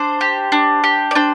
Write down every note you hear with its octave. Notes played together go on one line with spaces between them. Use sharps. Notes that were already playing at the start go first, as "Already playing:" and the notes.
Already playing: D4 C5
G4
D4
G4
D5
D4 C5